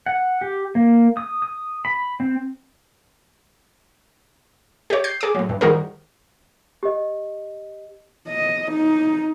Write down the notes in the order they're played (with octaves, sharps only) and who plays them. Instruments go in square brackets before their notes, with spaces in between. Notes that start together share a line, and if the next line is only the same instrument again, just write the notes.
[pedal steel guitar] F#5
G4
A#3
D#6
D#6
B5
C4
[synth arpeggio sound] G4 C#5
G6 C7
G#4 D6
A2 F#3
G2
D#3 F3 G3 F#4 G#4 A#4
[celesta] G4 D#5
[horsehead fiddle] D#5
D#4